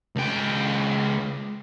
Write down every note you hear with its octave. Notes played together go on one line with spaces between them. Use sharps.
C#2 G5